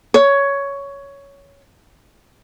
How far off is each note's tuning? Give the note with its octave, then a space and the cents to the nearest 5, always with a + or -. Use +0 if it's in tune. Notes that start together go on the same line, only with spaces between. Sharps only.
C#5 +10